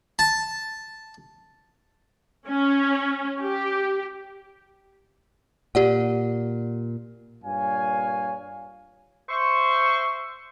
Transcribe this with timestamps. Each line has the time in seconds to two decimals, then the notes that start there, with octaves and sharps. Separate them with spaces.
0.19 A5
2.49 C#4
3.41 G4
5.75 A#2 G4 D5 F#5
7.43 G2 A#2 C#5 F5 G#5
9.29 C5 E5 C6 C#6